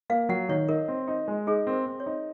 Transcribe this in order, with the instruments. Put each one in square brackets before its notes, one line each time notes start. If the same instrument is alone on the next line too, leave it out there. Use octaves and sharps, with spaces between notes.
[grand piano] A#3 [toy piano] F5
[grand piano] F#3 [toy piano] F#5
[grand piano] D#3 [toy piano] C#5
[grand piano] D#4 [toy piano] A#4
[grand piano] C4
D#4
G#3
[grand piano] D#4 [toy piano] G#4
[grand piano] C4 [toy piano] A#4
[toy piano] C5
[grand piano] C4
[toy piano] C#5
[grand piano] D#4